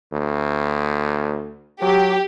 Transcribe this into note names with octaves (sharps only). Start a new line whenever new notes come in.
D2
F#3 G4